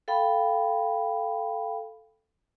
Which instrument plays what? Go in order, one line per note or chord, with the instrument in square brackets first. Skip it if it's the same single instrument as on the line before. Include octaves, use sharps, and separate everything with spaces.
[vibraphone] A4 F5 G5 B5